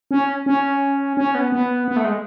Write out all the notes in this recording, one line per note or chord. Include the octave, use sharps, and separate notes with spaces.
C#4
C#4
C#4
B3
B3
B3
A3
G#3